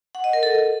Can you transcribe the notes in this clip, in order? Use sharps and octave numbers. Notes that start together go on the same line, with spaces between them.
F#5
D#5
A#4
A4